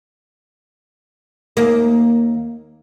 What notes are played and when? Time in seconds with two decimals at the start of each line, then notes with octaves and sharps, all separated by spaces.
1.57 D#2 A#3